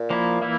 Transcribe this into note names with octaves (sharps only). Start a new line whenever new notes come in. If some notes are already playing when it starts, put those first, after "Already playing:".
Already playing: A#2
F3 A#3 E4
E3 A#3 E4